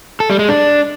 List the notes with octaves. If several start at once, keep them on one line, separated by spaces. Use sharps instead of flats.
A4
G3
G#3
D4